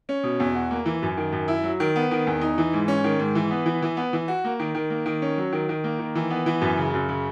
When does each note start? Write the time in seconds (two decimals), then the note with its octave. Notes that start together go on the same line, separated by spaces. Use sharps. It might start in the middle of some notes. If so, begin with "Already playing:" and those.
0.09 C#4
0.23 B2
0.40 E2
0.55 F#4
0.71 A#3
0.86 E3
1.02 F#2
1.17 D#3
1.32 F#2
1.48 E4
1.63 F#3
1.80 D#3
1.96 B3
2.11 D#3
2.27 E2
2.41 D#4
2.58 E3
2.73 G#2
2.88 C#4
3.04 D#3
3.19 G#2
3.35 E3
3.51 B3
3.66 E3
3.82 E3
3.97 B3
4.13 E3
4.28 F#4
4.44 A#3
4.59 D#3
4.75 D#3
4.90 A#3
5.06 D#3
5.22 C#4
5.38 F#3
5.53 D#3
5.69 D#3
5.84 A#3
5.99 D#3
6.15 E3
6.30 B3
6.46 E3
6.61 F#2
6.77 C#3
6.94 F#2
7.09 C#3